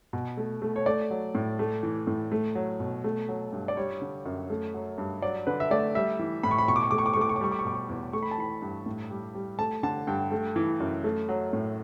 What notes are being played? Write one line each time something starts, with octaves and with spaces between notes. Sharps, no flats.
B2
A3
A3
C#5
A3 D5
F#3
A2
A3
E3
A2
A3
F#3
B2
A3
F#3
G2
D5
G3 C#5
D3
F#2
A3
F#3
G2
F#3 D5
D3 B4
E5
A3 D5
G3 E5
E3
A2 B5
C#6
B5
B2 C#6
D6
C#6
A3 D6
C#6
D6
C#6
A3 D6
C#6
D6
G3 C#6
D6
C#6
B2 D6
C#6
E2
A3 C#6
B5
A5
E3 B5
G2
A2
G3
G3
A3 A5
D3 A5
G2 G5
A3
E3
F#2
A3
F#3
A2